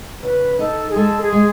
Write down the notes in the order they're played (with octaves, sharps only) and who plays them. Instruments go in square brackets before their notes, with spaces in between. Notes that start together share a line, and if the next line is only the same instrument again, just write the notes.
[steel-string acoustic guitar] C#3 [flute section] B4
[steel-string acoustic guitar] D#4 [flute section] A4
[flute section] G#4
[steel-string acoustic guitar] G#3 [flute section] A4
[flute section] G#4
[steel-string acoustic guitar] G#3